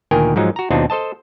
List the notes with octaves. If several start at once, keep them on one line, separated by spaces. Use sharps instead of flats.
D2 A#2 D#3 A#4 G5 G#5
G#2 F3 F#3 D#4
F#4 A#5
D#2 B2 C4 D4 D#4 F4
A4 C5 D#5 A5